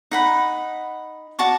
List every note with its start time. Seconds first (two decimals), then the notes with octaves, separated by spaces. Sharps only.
0.11 D#4 F#5 B5
1.39 F#4 D5 A5 C#6